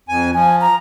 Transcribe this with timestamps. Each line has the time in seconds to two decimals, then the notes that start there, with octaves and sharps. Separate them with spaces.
0.09 F2 G#5
0.34 F3 G#5
0.61 A#5